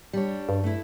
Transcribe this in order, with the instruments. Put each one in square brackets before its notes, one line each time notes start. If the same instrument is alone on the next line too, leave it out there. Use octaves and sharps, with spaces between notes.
[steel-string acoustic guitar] G3 D4 C#5
[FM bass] G2
[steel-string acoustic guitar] A3 E4